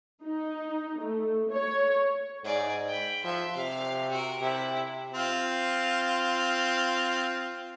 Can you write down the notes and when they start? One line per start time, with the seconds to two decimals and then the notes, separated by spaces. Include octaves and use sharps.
0.24 D#4
1.01 A3
1.51 C#5
2.44 G#2 G#4 D5
2.87 G5 B5
3.24 F3 E5 C6
3.56 C3 F5
4.10 F#4 A#4
4.42 C3 E4
5.14 C4 F4